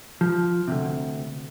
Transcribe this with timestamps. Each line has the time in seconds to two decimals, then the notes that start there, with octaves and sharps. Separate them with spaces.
0.21 F3
0.68 D2 G2 C3